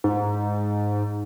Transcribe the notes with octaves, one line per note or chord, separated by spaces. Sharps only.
G#2